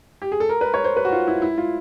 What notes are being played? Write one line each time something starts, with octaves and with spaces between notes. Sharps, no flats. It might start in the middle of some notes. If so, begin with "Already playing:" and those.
G4
G#4
A4
A#4
B4
C#5
C5
B4
F#4
F4
E4
E4
F4